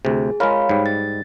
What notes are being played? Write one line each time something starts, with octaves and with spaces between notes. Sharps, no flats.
D2 C3 G#4
G#3 F4 A#4 C#5 F5 B5
G#2 G3
A6